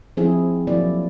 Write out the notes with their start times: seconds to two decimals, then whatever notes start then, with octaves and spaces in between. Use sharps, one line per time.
0.17 F3 C4 E4 G#4
0.67 F3 F#3 A#3 E4 D5